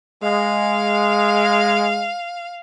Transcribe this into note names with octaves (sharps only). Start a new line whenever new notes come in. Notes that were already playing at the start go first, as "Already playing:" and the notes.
G#3 F5